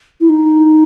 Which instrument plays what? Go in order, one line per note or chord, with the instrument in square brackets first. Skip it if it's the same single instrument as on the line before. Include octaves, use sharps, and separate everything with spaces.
[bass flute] E4
D#4